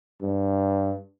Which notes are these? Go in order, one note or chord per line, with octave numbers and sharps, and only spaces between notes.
G2